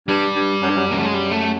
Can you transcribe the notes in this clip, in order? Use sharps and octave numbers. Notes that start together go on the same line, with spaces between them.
G2 G3
G2
F#2
G2
F#2
F#2 A#3
A3
G#3
G3
A3